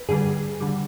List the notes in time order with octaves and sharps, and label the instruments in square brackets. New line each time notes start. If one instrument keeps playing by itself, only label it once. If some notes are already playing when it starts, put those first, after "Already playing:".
Already playing: [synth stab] B4
G2 D3 G3 G#4
D3 G3